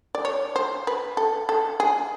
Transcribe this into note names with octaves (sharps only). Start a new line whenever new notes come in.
D5
C#5
C5
B4
A4
A4
G#4